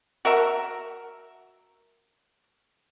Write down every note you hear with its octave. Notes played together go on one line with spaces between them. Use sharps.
F#4 A#4 E5 A#5